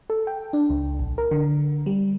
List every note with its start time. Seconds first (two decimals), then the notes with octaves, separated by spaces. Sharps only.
0.10 A4
0.27 G5
0.53 D4
0.70 C#2
0.99 A#1
1.18 A#4
1.31 D3
1.86 G3